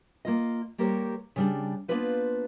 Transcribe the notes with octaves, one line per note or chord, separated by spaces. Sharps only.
A#3 F4 D#5
G3 A#3 G4 A#4 C5 C#5
C#3 G3 D4
A#3 B3 D4 F4 B4 C5